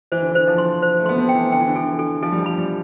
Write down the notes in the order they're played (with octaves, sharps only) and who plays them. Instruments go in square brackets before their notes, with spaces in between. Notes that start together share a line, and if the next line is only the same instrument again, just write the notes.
[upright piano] E3 [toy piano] C5
[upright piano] D3
[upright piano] E3 [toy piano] C5
[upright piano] F3
[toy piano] C6
C5
[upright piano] A3
[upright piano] B3 [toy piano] C6
[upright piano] C4
[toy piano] G5
[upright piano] E3
[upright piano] D3 [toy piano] G5
[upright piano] E3
D3
[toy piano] A4
[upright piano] D3
E3
[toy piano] A4
[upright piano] F3 [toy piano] A4
[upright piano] G3
[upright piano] F3 [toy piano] B5
[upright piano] G3